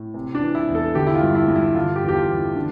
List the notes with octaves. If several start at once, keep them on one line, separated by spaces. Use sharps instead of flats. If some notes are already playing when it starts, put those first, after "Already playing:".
Already playing: A2
C3
D4
E3
E4
E2
A4
D3 G4
E4
F4
G2
E4
G2
E4
D3 F4
G4
E2
G4
F4
E2
E4
D3 D4